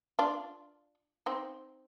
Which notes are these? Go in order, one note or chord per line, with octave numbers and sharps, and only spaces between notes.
D4 F4
C4 D#4